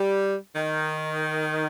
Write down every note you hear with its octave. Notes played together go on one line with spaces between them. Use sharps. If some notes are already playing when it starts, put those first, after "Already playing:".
Already playing: G3
D#3